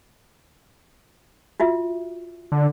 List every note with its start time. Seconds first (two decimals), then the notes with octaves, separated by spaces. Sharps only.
1.60 F4 F#4 E5
2.52 D3